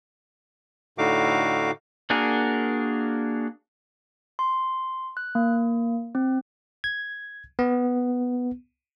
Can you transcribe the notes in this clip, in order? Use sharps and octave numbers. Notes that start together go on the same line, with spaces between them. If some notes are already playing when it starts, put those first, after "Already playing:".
A2 D3 D#4 F#4 F5 D6
A#3 D4 F#4 G#4 A#4
C6
F#6
A#3
C4
G#6
B3